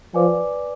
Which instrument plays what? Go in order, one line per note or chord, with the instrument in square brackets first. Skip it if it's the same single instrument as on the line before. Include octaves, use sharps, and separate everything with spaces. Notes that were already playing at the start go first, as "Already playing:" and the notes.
[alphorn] F3 [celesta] B4 D5 G#5 D6